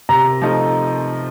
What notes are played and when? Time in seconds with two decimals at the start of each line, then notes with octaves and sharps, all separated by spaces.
0.09 C3 A#5
0.42 F3 A3 D#4